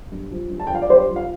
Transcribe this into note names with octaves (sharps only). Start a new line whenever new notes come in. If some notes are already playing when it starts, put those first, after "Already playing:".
G2
F3
G2
A5
G5
F3 F5
D5
G2 G4 C5
F3
F5